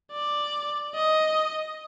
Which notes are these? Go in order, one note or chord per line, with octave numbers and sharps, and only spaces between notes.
D5
D#5